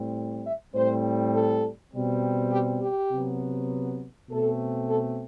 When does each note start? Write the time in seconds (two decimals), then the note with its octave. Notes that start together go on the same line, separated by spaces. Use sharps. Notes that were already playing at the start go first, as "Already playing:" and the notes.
Already playing: A2 G3 C4
0.45 E5
0.74 A2 G3 C4 C5
1.34 A4
1.93 B2 G3 C4
2.52 G4
2.82 G4
3.12 C3 F#3 B3
4.31 B2 A3 C4 A4
4.90 A4